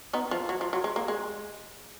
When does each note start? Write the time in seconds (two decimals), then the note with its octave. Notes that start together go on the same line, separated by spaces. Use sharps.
0.13 B3 D#4
0.31 F3
0.49 F#3
0.61 F3
0.73 F#3
0.84 G#3
0.96 A#3
1.08 G#3